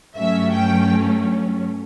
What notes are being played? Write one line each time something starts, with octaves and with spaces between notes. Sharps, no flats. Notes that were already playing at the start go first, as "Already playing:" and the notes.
G2 F#3 A3 C#4 E5
G5